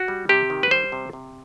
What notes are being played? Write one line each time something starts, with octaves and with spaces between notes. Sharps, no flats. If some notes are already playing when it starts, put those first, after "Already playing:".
Already playing: F#4
G3
C3 G4
D#3
B4
G3 C5
C3
C3